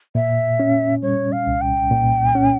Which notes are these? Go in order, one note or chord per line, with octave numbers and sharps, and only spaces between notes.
A#2 E5
C#4
G3 C#5
F5
C2
G5
A#2
C#4